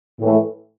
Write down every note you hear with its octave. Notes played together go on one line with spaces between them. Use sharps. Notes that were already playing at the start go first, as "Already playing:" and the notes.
A2 E3 A3